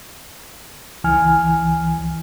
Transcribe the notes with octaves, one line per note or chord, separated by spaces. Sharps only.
C#2 E3 G#5 F6